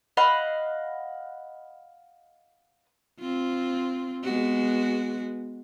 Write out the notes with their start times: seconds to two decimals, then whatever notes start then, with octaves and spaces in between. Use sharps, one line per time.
0.17 D#5 F5 F#5 B5
3.20 C4 F4
4.24 G#3 B3 F#4